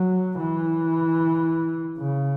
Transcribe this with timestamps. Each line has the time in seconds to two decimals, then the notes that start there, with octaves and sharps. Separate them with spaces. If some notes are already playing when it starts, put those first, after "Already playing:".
Already playing: F#3
0.39 E3
1.98 C#3